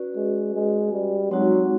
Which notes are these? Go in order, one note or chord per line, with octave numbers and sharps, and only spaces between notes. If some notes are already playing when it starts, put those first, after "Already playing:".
Already playing: C#4 F#4 B4 D5
G#3
G#3
G3
F#3 G#3 C4 D#4 F#4